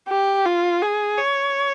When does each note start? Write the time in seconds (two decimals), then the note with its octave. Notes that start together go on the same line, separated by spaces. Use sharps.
0.09 G4
0.45 F4
0.82 G#4
1.18 C#5